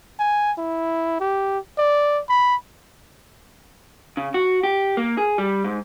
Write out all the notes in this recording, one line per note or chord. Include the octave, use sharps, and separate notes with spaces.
G#5
E4
G4
D5
B5
C#3
F#4
G4
A#3
G#4
G3
G#2